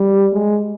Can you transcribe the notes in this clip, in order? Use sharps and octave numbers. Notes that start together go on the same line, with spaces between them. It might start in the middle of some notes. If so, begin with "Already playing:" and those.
Already playing: G3
G#3